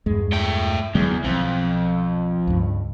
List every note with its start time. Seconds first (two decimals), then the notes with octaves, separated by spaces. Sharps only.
0.06 E2 G2 G#3
0.33 A3 G5
0.95 E2 D3 F#3 G#3
1.24 B1 F2
2.47 C#2 G2